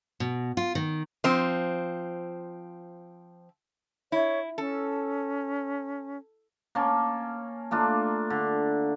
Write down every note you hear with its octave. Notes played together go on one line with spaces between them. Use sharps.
B2
F4
D#3
F3 C4
E4 C#5
C#4 A4
A#3 C#4 A5
A3 A#3 D4 F4
D3